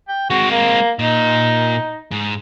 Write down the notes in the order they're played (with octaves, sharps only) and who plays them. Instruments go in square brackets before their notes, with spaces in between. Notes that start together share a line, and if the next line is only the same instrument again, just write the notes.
[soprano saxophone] G5
[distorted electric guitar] G#3 C4 [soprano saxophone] F#4
[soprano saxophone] A#3
[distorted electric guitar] A#2 [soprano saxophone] D#4
[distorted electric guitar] G#2